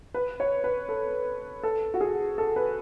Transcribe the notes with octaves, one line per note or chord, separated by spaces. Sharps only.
B4
C#5
B4
A4
A4
F#4
G#4
A4
B4